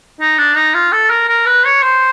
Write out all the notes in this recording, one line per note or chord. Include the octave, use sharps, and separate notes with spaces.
D#4
D4
D#4
F4
A4
A#4
A#4
B4
C#5
C5